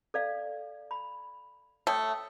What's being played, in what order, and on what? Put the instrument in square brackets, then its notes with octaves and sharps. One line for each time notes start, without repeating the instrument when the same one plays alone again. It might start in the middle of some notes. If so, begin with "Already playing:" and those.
[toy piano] A4 D5 F5
B5
[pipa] A3 [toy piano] C#5 G5 D#6